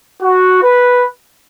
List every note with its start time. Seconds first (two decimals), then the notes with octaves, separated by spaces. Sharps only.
0.22 F#4
0.62 B4